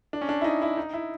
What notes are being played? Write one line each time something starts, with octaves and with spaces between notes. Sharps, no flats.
D4
C#4
D4
E4
D#4
E4
D#4
E4